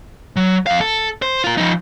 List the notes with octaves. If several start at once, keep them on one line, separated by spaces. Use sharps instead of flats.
F#3
F2 F5
A4
C5
F4 A#4
F3 D#4